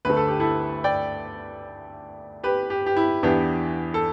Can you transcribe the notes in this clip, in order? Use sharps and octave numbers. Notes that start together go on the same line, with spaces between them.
D2 D3 A3 B4
A4
G4
E4 A4
D5 G5
G4 B4
G4
G4
E4
E2 E3 B3 D4 G4
A4